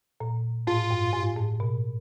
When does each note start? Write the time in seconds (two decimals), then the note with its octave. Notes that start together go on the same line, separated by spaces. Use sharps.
0.20 A#2
0.67 A2 F4
0.91 G2
1.13 G#2
1.36 A2
1.60 B2